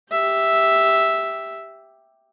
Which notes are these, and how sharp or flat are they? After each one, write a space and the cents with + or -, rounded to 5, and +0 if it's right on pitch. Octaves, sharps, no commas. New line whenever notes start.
G4 +5 E5 +0